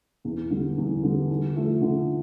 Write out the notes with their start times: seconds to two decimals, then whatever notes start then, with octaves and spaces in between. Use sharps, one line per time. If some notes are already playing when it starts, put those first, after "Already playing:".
0.24 E2
0.50 D3 G3
0.78 E2
1.03 D3 G3
1.30 D3
1.56 F3 A3
1.81 D3